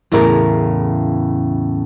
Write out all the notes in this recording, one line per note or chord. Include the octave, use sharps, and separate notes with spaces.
E2 A2 C#3 E4 A#4